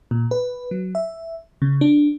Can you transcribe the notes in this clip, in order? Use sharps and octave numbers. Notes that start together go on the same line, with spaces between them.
A#2
B4
F#3
E5
C#3
D4